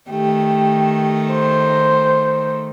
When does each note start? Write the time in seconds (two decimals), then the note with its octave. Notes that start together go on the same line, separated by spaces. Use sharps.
0.10 D#3 A3 G4
1.32 C5